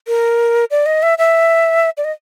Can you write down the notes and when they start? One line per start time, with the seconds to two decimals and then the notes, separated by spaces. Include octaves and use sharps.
0.07 A#4
0.71 D5
0.86 D#5
1.03 E5
1.18 E5
1.97 D5
2.04 D#5